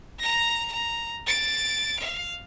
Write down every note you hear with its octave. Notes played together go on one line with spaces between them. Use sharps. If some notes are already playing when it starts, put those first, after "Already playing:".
A#5 A#6
A#5
A6 D7
F5